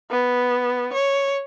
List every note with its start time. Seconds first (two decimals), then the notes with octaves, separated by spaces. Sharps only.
0.11 B3
0.94 C#5